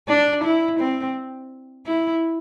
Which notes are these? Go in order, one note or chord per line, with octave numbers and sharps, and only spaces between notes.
D4
E4
C4
E4